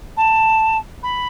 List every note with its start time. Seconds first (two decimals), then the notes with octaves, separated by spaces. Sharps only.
0.16 A5
1.03 B5